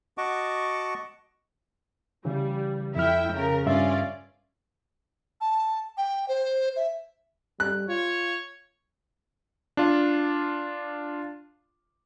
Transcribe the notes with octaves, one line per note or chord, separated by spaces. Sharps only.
F#4 D#5 F#5 A5 C#6 D6
C#3 E3 G3
F2 E4 E5 G5 F6
C#3 A#4
G2 C#4 F4 D5 E5
A5
G5
C5
E5
G3 F#6
F4 C#5
D4 F4